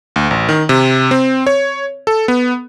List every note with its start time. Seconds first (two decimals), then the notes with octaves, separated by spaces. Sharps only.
0.16 D2
0.31 A1
0.49 D#3
0.69 C3
1.11 C4
1.47 C#5
2.07 A4
2.28 B3